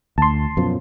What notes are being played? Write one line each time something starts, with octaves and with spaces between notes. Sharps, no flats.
D2 A5 C6
F#2 B2 F3